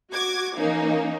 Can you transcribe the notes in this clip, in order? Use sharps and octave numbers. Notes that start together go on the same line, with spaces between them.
F#4 D6 G#6
E3 A#3 C#4 D#4